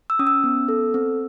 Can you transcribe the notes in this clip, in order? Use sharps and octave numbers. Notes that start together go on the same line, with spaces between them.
E6
C#4 D#6
E6
B3
A4
C4